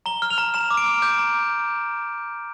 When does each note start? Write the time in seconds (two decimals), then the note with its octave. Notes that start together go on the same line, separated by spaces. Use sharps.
0.06 A#5 G7
0.22 F6
0.30 F7
0.38 A#5
0.54 A#5 E7
0.70 D6
0.77 D7
0.86 F6
1.02 D6 G6
1.18 A#5